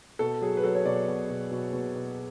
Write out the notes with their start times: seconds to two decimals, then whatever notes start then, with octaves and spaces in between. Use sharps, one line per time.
0.19 B2 A4
0.42 F#3 G#4
0.57 B4
0.64 F#3 A4
0.75 C#5
0.86 B2 D5
1.08 B2
1.30 B2
1.51 B2
1.73 B2
1.96 B2